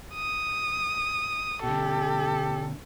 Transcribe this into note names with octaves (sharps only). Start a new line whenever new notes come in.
D#6
B2 D3 G4 A4